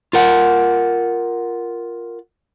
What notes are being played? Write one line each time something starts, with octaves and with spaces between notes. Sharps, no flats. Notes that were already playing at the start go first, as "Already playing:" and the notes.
F4 A#4 F#5